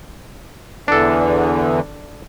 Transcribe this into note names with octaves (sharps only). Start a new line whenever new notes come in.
E2 D3 E3 D4 A4